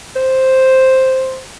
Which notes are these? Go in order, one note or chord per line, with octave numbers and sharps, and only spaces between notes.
C5